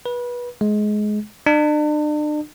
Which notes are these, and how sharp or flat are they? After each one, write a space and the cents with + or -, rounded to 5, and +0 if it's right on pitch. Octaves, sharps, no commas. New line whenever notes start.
B4 -25
G#3 +20
D4 +40